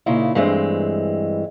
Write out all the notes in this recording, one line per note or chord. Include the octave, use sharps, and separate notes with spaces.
A#2 C#3 D#4 E4
G2 E3 G#3 A3 C4